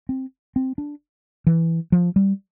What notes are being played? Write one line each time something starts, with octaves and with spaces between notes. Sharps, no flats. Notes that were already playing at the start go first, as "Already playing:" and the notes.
C4
C4
D4
E3
F3
G3